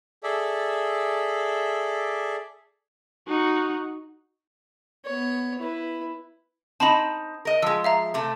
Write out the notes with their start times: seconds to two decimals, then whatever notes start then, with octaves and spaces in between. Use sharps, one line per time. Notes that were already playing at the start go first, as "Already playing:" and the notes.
0.23 G#4 A4 D5 E5
3.28 D#4 F#4
5.05 B3 C#5
5.59 E4 B4
6.80 C4 D#4 A5 B5
7.45 A#4 D#5
7.62 F3 G#3 E6
7.84 E5 F5 A#5
8.14 C3 A3